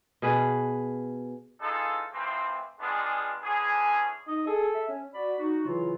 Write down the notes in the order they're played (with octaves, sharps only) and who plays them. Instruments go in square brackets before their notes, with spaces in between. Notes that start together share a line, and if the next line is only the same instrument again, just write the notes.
[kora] B2 G#4 B4
[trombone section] E3 D#4 F4 G#4 A4
A2 E3 F3 C4
G3 G#3 B3 D4 F4 G#4
D3 E3 C#4 G#4
[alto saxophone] D#4 [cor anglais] D#5
[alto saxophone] G#4 [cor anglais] A4
[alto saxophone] E5
C#4
[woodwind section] F#4 D5 B5
D#4 F#4
C#3 E3 F#3 E4 F4